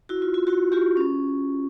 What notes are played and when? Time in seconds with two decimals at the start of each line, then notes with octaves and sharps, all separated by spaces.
0.09 E4 F#4
0.22 F4
0.34 F4
0.47 E4 F#4
0.72 F4 G4
0.97 C#4